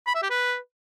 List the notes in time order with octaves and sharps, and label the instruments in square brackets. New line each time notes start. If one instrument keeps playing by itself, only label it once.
[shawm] B5
E5
G4
B4